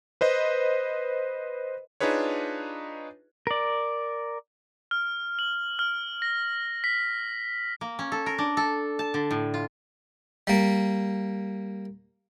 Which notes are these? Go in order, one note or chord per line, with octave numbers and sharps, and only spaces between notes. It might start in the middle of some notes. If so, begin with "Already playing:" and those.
B4 C5 D#5
D4 D#4 F4 G#4 B4 C#5
A#4 D5
F6
F#7
F6
A#6
B6
A#3
C#4
A4
A#4
D4
A4
A5
D3
A2
F4
G3 A#3